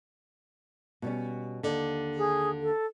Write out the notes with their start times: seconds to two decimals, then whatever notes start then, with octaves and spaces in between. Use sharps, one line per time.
1.02 B2 G3 C#4
1.63 D#2 D3
2.18 G#4
2.62 A4